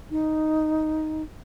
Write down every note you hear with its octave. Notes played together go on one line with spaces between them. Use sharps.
D#4